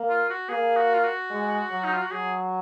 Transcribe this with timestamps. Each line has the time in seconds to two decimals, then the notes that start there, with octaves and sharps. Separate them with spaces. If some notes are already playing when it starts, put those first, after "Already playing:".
Already playing: A#3
0.09 F4
0.30 F#4
0.49 A#3 G#4
0.77 F#4
0.94 F4
1.04 F#4
1.31 G#3
1.71 F#3
1.84 D#4
1.93 F4
2.02 F#4
2.12 F#3 G#4